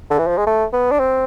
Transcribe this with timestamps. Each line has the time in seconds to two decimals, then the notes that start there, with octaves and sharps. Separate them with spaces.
0.10 D3
0.18 E3
0.27 F3
0.38 G#3
0.47 A3
0.73 B3
0.91 D4
0.99 C4